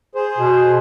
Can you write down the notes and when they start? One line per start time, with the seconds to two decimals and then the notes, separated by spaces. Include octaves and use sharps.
0.15 G#4 C5
0.38 B2